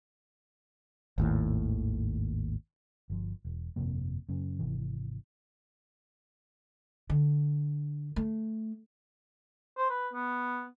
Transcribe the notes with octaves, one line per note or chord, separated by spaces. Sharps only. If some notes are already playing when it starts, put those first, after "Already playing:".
G#1 D#2 A2
G1 F3
E1
G1 F2 C3 A#3
F#2 C#3
G#1 C3 E3
D3
A3
C5
B4
B3